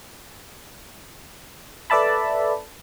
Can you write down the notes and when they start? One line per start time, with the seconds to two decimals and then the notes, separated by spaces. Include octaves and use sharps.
1.90 A4 B4 D5 E5 A5 B5